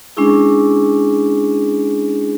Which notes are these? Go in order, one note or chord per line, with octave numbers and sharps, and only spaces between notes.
G#3 C#4 D4 E4 G#4